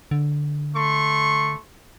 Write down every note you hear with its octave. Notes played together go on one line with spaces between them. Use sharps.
D3
A3 C6 C#6